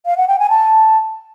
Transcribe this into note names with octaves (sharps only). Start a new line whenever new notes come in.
F5
F#5
G5
G#5
A5